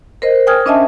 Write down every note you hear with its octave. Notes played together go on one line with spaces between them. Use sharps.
A#4 C5 D#5
G5 G#5 D#6 F6 G#6
C#4 D4 D#5 E5 G#5 A5